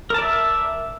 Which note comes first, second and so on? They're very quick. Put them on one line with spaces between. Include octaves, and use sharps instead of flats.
A#4 A5 D5 E5